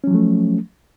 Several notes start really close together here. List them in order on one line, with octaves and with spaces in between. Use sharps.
C#4 F#3 F3 A3